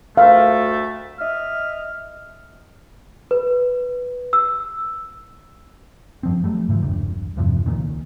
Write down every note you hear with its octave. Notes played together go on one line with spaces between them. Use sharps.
D2 A3 F5
D#5 E5 F6
B4
E6
F#2 F3 C4
F#3 G3 A3
G#2 C#3 E3 F3
E1 B1 G2
E2 G2 C3 F3
C#2 A#2 D#3